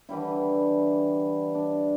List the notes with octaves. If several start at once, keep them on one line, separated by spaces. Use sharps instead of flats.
D3 E3 G3 E4
D4